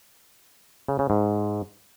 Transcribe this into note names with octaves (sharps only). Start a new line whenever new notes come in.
C#3
C#3
G#2